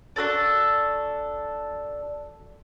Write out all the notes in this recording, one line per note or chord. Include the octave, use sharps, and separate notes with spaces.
D4 F#4 A4 D5